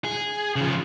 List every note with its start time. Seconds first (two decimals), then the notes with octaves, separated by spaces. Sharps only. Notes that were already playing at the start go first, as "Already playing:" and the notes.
0.05 G#4
0.56 C#3 F3